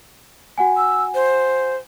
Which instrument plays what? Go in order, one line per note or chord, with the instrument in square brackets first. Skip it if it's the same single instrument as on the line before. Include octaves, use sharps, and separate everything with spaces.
[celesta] F#4 F#5 G#5
[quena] E6
C5